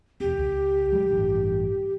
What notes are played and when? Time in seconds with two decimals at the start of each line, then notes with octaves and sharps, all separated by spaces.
0.20 E1 C4 G4
0.38 C#2
0.92 F#3 G#3
1.09 A1 G2 E3